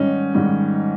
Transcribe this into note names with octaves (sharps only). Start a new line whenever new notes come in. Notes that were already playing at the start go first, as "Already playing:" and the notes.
Already playing: G#2 D#3 G3 C#4 D#4
G#2 D#3 G3